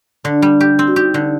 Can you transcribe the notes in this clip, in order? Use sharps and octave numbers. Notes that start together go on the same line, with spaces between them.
D3 D4
G3
G4
C4
F#4
D#4 G4
D3